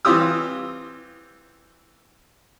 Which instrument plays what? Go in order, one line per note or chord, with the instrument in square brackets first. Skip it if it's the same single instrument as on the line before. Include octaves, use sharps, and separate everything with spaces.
[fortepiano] E3 C4 F4 G4 D#6 E6